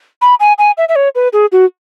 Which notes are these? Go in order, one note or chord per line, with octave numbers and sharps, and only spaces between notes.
B5
G#5
G#5
E5
E5
C#5
B4
G#4
F#4